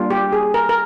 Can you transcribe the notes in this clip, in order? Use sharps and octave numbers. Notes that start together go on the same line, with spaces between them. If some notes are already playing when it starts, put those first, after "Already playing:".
Already playing: G3 A#3 D4 F4
G4
G#4
A#4
A#4